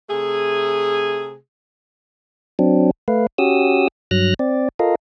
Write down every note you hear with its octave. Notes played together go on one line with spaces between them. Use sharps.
C3 A3 G#4
F#3 C4 D4
A3 B4 F5
C#4 F#4 G4 D#6 E6
G2 F#3 F6 F#6 A#6
C4 D5
F4 A4 A#4 D#5 F5